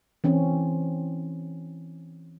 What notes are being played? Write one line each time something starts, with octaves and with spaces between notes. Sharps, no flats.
E3 C4 C#4